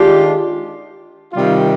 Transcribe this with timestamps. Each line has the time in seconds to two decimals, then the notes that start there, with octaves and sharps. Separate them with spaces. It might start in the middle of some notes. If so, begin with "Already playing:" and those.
Already playing: D#3 G#3 D4 F4 G4
1.33 C3 D#3 G3 F4